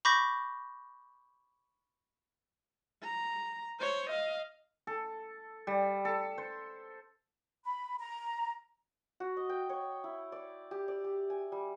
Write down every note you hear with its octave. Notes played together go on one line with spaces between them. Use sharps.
B5 C#6 D6 G6 A#6 B6
A#5
C5 C#5
D#5 F5
A4
G3
A4
C5
B5
A#5
F#4
D#5
G5
C#5
E4
D5
G4
D5
G4
G#5
G3